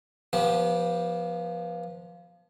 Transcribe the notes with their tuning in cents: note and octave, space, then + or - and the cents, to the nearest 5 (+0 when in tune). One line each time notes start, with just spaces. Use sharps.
F3 +0 B3 -30 G4 +0